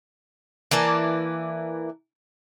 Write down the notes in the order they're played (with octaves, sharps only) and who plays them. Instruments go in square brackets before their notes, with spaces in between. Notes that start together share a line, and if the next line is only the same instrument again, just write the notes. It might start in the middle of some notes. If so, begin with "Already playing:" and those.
[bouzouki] E3 A#3 D5 A5